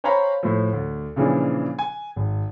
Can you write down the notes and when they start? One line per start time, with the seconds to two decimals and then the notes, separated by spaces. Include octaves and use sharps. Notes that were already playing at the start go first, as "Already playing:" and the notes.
0.04 C5 C#5 F5 G#5 A#5 B5
0.43 A2 F3
0.73 D2
1.16 A#2 C#3 E3 F3 D4
1.78 G#5
2.16 G#1